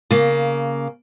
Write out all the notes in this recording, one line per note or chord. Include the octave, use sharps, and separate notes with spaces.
C#3 A#3